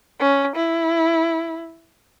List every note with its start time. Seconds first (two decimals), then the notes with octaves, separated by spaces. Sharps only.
0.19 C#4
0.56 E4